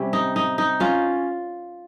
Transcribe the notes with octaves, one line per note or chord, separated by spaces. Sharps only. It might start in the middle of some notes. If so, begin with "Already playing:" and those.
Already playing: C3 G3 C#4
D#4
D#4
D#4
C#4 F4